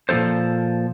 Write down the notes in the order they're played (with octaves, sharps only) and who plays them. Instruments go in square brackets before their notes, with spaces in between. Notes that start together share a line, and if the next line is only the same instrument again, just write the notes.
[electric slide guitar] A#2 F3 A#3 A4 C5